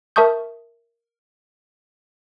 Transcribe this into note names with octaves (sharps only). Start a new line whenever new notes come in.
A#4 E5 A5 C#6 D#6 G6